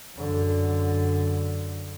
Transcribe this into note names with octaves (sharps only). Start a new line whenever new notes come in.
F#2 D3